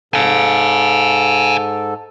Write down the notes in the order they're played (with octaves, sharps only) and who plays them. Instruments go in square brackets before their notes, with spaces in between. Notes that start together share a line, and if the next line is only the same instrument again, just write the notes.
[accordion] G#2 A4 [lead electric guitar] F5 G#5